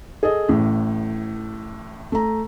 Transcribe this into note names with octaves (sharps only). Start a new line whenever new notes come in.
G#4 A4 D#5
A1 A2
A3 A#5